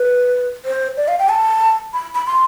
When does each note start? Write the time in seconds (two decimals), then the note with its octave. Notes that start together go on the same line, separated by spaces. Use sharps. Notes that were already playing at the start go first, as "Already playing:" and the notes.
Already playing: B4
0.65 C5
0.97 D5
1.08 F5
1.19 G5
1.29 A5
1.93 B5
2.15 B5
2.27 C6